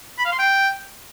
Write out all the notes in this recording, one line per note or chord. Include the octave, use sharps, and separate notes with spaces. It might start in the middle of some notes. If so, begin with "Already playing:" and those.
B5
F5
C6
G5